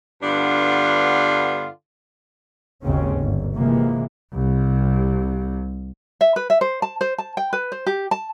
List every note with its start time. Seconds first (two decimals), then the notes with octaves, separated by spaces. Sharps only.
0.23 G2 D3 B3 D4 F4
2.84 G#1 D#2 G#2 C#3 C4 C#4
3.17 G1
3.56 C3 E3 F3 G#3 A#3
4.33 C2 C3
6.21 E5
6.36 B4
6.50 E5
6.61 C5
6.82 A5
7.01 C5
7.18 A5
7.37 G5
7.53 B4
7.72 C5
7.86 G4
8.11 A5